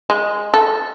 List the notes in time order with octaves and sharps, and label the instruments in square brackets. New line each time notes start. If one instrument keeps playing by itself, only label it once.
[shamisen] G#3
A4